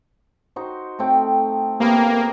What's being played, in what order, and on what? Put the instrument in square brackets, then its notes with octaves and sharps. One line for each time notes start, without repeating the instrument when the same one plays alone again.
[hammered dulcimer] D#4 F#4 C5
A3 C4 G5
[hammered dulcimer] C3 B3 B5 [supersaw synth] A#3